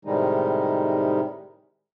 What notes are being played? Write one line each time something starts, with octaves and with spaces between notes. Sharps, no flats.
A2 C3 D#3 G3 G#3 D#4